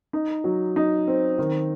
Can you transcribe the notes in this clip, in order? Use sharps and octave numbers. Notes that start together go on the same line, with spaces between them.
D#4
F#3
D#4
C4
D#3